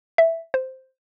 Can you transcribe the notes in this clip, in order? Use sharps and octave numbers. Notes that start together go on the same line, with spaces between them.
E5
C5